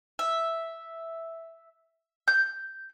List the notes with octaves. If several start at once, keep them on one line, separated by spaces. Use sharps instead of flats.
E5
G6